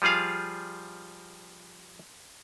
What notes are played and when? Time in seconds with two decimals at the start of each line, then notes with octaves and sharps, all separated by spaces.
0.02 F3 G3 F4 G#4 F5